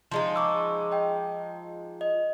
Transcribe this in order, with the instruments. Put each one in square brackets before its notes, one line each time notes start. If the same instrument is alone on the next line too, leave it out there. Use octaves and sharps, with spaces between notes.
[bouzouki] F3 G#3 D#4
[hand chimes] C#6 D6 E6
D#5 G5
D#5